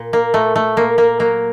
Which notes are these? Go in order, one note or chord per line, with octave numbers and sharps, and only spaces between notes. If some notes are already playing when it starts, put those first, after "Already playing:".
Already playing: A#2
A#3
A#2 A3
A3
A#2 A#3
A#3
F#3 A#3